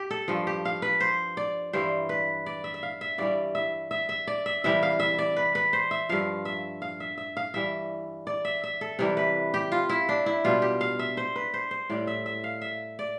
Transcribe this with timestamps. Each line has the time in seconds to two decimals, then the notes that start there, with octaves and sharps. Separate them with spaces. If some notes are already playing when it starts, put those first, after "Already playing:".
Already playing: G4
0.11 A4
0.28 G2 F3
0.47 G4
0.65 F5
0.82 B4
1.00 C5
1.37 D5
1.73 G2 E3 G3 C5
2.09 B4
2.46 D5
2.64 E5
2.74 E5
2.83 F5
3.01 E5
3.18 G2 E3 G3 D5
3.55 E5
3.91 E5
4.09 E5
4.27 D5
4.46 E5
4.64 C3 E3 G3 E5
4.83 F5
5.00 E5
5.19 D5
5.36 B4
5.55 B4
5.73 C5
5.91 E5
6.09 G2 F3 F5
6.45 E5
6.82 F5
7.00 E5
7.18 E5
7.37 F5
7.54 G2 E3 G3 E5
8.27 D5
8.45 E5
8.64 E5
8.81 A4
8.99 C3 E3 G3
9.17 B4
9.54 G4
9.72 F4
9.89 E4
10.09 D4
10.26 E4
10.44 B2 G3 F4
10.62 G4
10.81 F5
10.99 E5
11.17 C5
11.36 B4
11.54 C5
11.71 C5
11.90 A2 G3 D5
12.07 E5
12.26 E5
12.44 F5
12.62 E5
12.99 D5